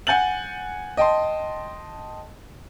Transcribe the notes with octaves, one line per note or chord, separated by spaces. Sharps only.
F#5 G#5 G6 A6 F#7
D#5 G5 A5 C6